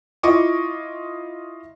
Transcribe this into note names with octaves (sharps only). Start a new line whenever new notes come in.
E4 F4 D#5 C#6 D6